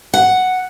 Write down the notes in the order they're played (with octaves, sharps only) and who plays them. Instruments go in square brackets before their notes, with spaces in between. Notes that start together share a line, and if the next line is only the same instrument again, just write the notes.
[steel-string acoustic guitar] F#5